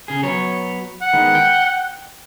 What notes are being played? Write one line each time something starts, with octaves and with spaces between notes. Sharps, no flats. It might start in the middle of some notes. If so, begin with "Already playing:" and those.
C#3 G#4
F#3 B3 C#5
F#5
D#3 G#3 B3
G5